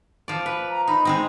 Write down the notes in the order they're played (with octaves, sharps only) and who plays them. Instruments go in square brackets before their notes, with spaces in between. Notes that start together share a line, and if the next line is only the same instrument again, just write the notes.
[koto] F3 D5
B4
[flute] A#5
[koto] D#4 [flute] B5
[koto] G#3 C4 D#4